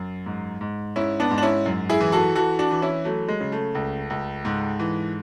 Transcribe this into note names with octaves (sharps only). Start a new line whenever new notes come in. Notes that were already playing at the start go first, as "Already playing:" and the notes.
Already playing: F#2
G#2
G#2
G#2 C#4 E4
B3 D4
G#2
D4
C#4 E4
F#2
E4 G#4
E3
F#4 A4
E3 F#4 A4
D4 F#4
E3
C#4 E4
F#3 A3
G#3
C#3
A3
C#2
C#2
G#2
E3